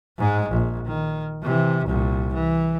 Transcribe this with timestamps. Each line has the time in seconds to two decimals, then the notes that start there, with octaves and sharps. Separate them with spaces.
0.18 G#2 G#3
0.49 A#1
0.86 D#3
1.42 C3 E3
1.85 C2 A#2
2.34 E3